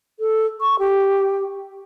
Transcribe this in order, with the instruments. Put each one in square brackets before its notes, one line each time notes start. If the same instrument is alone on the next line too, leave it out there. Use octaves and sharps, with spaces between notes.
[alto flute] A4
C#6
G4